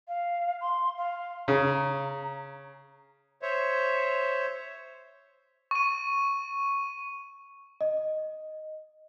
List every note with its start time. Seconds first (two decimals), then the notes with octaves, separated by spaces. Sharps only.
0.08 F5
0.61 C6
0.97 F5
1.48 C#3 A#5
3.42 C5 C#5 E5
5.71 C#6 D#7
7.81 D#5